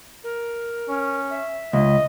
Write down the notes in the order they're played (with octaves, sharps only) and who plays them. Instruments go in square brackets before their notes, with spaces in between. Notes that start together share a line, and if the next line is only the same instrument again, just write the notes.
[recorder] A#4
[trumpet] C#4
[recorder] E5
[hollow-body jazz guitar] C#2 [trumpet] D#5